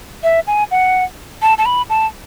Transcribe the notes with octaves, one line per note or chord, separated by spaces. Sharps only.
E5
G#5
F#5
A5
A5
B5
A5